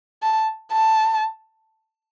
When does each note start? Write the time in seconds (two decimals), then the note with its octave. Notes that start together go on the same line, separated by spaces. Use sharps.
0.23 A5
0.72 A5